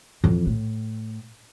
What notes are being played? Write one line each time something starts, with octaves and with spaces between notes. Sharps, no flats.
F2 E3
A2